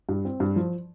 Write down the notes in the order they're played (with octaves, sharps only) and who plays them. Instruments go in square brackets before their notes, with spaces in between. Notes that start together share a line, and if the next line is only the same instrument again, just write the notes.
[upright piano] G2
C4
G2
F3